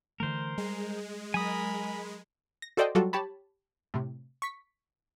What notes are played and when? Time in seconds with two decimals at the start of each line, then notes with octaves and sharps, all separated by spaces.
0.20 D3 E3 A3 A#4 C5
0.58 G3 G#3
1.34 F#3 A#4 G#5 B5 D#6
2.62 A#6
2.77 F#4 A4 C5 D5 D#5 G5
2.95 F#3 G3 F4 F#4 A4
3.13 G4 C#5 A5 B5
3.94 A2 C3
4.42 C#6 B6